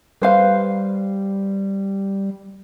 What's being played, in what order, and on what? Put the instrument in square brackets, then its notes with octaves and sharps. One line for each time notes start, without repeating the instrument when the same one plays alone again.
[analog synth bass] G3 [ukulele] B4 C5 F5